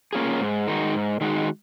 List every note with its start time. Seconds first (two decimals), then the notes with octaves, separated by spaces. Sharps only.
0.13 A#3 C#4 F4 G#4
0.40 G#2
0.67 D#3 G#3 D#4 F#4
0.93 G#2
1.21 D#3 G#3 D#4 F#4